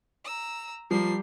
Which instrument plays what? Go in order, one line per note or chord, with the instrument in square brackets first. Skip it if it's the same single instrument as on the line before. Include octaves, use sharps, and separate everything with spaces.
[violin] A#5 E6
[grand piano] F3 [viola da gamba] G3 [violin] A#3 C7